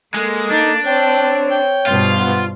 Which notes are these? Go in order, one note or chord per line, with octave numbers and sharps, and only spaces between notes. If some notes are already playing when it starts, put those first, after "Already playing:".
G#3 A#3 A4
D4 D#4
C4 C#5 G5
G5
G2 B2 F3 F4
B3